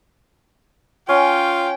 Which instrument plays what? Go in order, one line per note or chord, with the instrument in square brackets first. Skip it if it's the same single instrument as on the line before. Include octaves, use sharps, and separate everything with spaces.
[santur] C#4 [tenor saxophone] F4 [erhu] G5